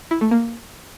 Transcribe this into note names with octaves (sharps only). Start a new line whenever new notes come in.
E4
A3
A#3